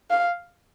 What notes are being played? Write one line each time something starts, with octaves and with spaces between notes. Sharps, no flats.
F5